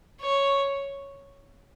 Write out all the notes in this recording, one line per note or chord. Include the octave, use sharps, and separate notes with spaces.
C#5